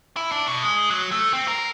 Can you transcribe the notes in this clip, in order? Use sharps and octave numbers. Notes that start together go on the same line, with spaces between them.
E4
D4
B2
G#3
F#3
A3
C4
A#4